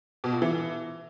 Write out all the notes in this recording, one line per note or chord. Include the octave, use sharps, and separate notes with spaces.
B2
A#2
E3